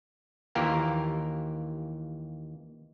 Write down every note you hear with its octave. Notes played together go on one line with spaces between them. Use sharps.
D#2 E3 A#3 F4 G4 A#4